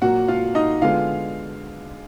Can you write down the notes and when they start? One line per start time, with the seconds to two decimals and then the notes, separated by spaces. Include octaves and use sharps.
0.02 A#2 F#3 A#3 F#4 F#5
0.28 F4 F5
0.55 D#4 D#5
0.82 D3 G#3 B3 F4 F5